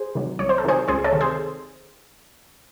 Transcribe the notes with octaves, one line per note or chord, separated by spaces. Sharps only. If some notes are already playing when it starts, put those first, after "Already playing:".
Already playing: G#4 C5
C3 D#3 F#3
C2 C#5
C5
A4
C3 D#3 F#3 G#4 C5
C#2 G#4 C5
A4 C#5
C3 D#3
G#4 C5